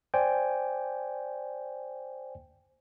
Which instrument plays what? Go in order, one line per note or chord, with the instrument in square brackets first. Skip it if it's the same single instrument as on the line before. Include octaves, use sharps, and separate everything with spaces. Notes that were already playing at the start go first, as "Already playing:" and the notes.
[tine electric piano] C5 D5 G5 G#5